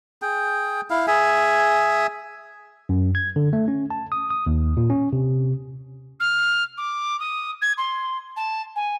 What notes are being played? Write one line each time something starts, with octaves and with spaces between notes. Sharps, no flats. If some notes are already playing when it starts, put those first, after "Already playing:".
G#4 G5
E4 F5
G#4 E5 G#5
F#2
G#6
D3
A3
C#4
A5
D#6
D#6
D#2
A#2
C#4
C3
F6
D6
D#6
G#6
C6
A5
G#5